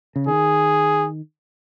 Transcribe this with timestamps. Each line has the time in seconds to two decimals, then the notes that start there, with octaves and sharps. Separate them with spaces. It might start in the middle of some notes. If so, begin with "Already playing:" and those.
0.16 C#3
0.27 D#3 G#4